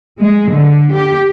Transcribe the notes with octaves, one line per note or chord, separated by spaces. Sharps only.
G#3
D3
G4